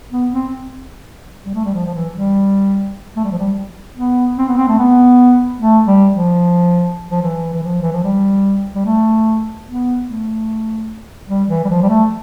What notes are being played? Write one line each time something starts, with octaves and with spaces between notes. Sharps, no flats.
B3
C4
G3
A3
G3
F3
F3
E3
G3
A3
G3
F3
G3
B3
C4
B3
C4
A3
B3
A3
G3
F3
F3
E3
E3
F3
E3
F3
G3
G3
A3
B3
A3
G3
E3
G3
F3
G3
A3